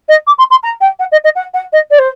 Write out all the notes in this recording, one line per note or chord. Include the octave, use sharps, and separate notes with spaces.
D#5
D6
C6
C6
A#5
G5
F#5
D#5
D#5
F#5
F#5
D#5
D5
C5